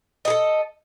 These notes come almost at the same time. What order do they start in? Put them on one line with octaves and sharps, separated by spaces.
D#5 G#4 A4